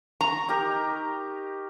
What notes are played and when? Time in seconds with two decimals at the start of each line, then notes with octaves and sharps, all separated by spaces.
0.21 A#5 C#6
0.49 D#4 G4 A#4